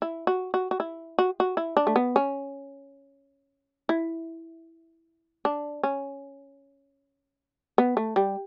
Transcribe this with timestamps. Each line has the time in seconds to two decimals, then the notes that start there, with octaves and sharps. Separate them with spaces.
0.02 E4
0.27 F#4
0.54 F#4
0.71 F#4
0.80 E4
1.19 F#4
1.40 F#4
1.57 E4
1.77 D4
1.87 A3
1.96 B3
2.16 C#4
3.89 E4
5.45 D4
5.83 C#4
7.78 B3
7.97 A3
8.16 G3